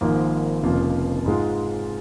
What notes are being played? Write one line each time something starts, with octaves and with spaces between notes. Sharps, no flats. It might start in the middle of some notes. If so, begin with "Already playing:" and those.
G#1 G#2 F3 A#3
F1 F2 C#3 A#3 F4
G#2 G#3 F4